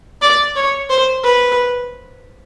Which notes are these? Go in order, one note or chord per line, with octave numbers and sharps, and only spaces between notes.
D5
C#5
C5
B4